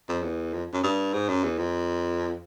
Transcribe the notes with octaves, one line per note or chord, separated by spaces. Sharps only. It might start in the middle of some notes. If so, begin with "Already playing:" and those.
F2
E2
F2
F#2
G2
G#2
F#2
E2
F2